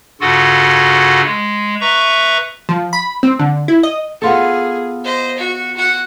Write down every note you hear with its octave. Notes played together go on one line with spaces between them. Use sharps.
G2 C#3 F4 F#4 A4 F#5
G#3
B4 E5 A#5 C#6
F3
B5
C4
D3
E4
D#5
B3 F4 G#4 A4
C5 D#5
F#4
F#4 F#5